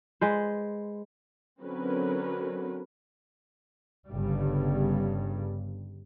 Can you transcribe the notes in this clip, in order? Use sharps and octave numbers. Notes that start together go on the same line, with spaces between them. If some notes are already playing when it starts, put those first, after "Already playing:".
G#3 B4 C5
D3 F#3 C4 C#4 A#4 B4
G1 G2 C#3 G3